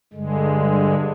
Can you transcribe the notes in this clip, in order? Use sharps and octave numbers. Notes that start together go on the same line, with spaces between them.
G2 D3 G#3